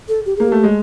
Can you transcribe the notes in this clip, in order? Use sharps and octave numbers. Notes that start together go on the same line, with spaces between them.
A4
G4
A#3 G#4
A3 G4
G#3